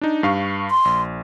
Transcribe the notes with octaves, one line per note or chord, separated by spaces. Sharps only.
D4 D#4
G2 F5 C#6
C6
A#1